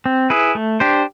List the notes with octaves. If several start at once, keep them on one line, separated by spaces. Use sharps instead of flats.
C4
E4 G#4 B4
A3
D4 G4 C5